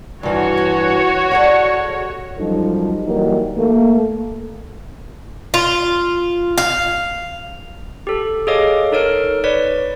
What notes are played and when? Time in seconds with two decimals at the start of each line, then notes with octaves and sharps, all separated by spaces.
0.23 G2 E3 F4 F#4 C#5
0.57 G4
1.31 G3 G#3 A4 F#5
2.38 F#2 F3 G3 D#4 A4
3.05 E3 F#3 G3 A#3 D#4
3.56 A3 A#3
5.54 F4
6.58 F5
8.07 G4 A4
8.47 G#4 A4 C#5 D#5 F5 D6
8.92 D#4 A4 A#4 C#5 F6 D7
9.44 B4 C#5 D5 B6